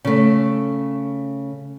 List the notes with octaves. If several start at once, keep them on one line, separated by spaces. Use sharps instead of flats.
C#3 A3